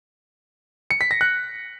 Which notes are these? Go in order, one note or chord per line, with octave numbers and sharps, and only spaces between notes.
C#7
B6
A#6
F#6